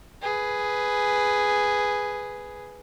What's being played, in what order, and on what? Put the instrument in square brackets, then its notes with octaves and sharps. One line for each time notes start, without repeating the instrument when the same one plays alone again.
[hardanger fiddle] G#4 B4